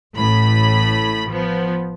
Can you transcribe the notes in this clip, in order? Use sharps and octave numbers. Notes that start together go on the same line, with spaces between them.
A1 A2 B5
F3 B3